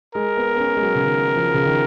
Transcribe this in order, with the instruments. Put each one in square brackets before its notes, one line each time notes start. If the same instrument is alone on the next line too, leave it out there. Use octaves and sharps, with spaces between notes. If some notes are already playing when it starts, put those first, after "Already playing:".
[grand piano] G#3 [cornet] A#4
[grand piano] B3
B3
C#4
G#3
F#3
C#3
D#3
F3
C#3
D#3